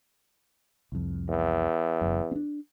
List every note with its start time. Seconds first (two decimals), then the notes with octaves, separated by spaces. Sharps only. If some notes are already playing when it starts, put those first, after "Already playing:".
0.92 C2 F2
1.29 E2
2.01 F#1 F#2
2.31 C4 D4